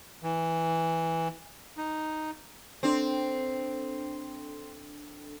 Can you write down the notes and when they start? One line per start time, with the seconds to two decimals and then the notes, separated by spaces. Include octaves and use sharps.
0.23 E3
1.77 D#4
2.83 C4 D4 A4 G5